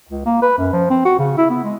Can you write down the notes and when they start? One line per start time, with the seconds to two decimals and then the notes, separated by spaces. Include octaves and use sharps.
0.09 C#2
0.26 A#3
0.42 B4
0.58 F#2
0.73 F3
0.90 C4
1.05 F#4
1.19 C#3
1.38 E4
1.50 B3
1.64 G#3